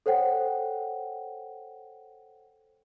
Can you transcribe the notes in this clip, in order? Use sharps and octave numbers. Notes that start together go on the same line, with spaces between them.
A4 C5 C#5 F#5 G5